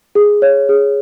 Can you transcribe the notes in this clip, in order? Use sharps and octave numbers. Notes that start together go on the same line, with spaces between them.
G#4
C#5
G#4